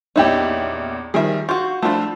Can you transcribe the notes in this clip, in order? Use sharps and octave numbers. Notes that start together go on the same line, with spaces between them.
A#1 E2 C#4 D#4 E4 G4
D#3 F3 G3 G#4 E5
F4 F#4 C#6 G6
F3 A3 D4 E4 F4